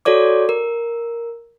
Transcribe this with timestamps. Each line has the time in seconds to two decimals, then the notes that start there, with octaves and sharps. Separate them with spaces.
0.05 F#4 A4 C#5 D5 D6
0.49 A#4